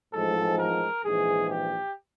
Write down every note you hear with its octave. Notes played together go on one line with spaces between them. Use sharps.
A1 G#2 F3 G#3 A4
A#4
A#1 G#2 E3 G#4
G4